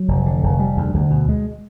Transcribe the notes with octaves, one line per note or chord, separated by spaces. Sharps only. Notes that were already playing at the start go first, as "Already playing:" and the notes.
Already playing: F#3
F1
D3
F1
G3
D2
D2
B2
G#3